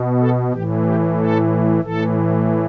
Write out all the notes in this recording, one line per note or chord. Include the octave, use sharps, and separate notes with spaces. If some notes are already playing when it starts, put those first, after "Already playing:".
Already playing: B2
A4
A2 E3 G4
G4
A4
A2 E3 A4